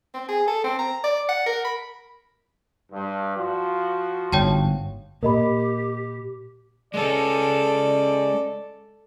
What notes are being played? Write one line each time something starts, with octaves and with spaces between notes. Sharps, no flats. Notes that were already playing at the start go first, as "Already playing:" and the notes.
C4
G#4
A4
C4
A#5
D5
F#5
A#4
B5
G2
F3 F4 F#4
G1 G#2 C#5 G5 A5
A#2 G4 A#4 D#5 B5
G#3 C#4 A4 D5